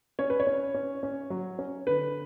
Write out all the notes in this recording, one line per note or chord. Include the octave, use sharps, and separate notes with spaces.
C#4 C#5
B4
C#5
C#4
C#4
C#4
F#3
C#4
D3 B4